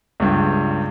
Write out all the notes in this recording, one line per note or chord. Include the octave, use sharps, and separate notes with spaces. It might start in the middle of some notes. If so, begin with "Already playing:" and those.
C#2 G2